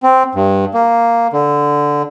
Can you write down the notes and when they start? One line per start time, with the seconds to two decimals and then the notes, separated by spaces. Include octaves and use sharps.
0.03 C4
0.35 G2
0.74 A#3
1.33 D3